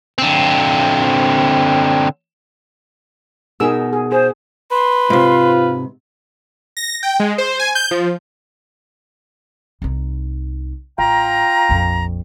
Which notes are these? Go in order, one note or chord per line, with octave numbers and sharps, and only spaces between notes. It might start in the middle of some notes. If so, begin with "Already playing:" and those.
D3 C4
B2 D#4 G#4 A#4 E6
G#4
G#4 C5
B4 C6
G#2 C3 F4
A#6
G5
G#3
C5
G#5
G6
F3
C2 D#4
A1 F4 G5 A#5
A#1 F2